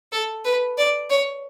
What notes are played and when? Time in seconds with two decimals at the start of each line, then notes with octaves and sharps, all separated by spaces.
0.12 A4
0.45 B4
0.78 D5
1.10 C#5